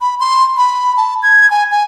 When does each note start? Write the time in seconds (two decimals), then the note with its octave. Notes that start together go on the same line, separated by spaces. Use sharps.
0.01 B5
0.20 C6
0.57 B5
0.97 A5
1.23 G#6
1.51 G#5
1.71 G#5